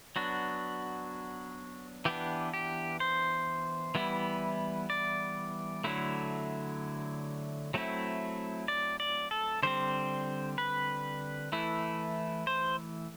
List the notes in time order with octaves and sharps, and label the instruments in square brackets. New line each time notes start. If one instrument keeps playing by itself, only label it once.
[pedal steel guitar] F#3 B3 D4 F#4
E3 B3 D4 G4
G4
C5
E3 G3 B3 E4
D5
D3 F#3 A3 E4
F#3 A3 C4 E4
D5
D5
A4
D3 G3 C4 C5
B4
E3 A3 E4
C5